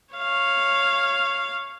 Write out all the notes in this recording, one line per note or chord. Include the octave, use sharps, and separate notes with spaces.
C#5 F5